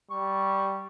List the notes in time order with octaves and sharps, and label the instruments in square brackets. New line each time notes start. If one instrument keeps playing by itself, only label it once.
[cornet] G3 [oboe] C#6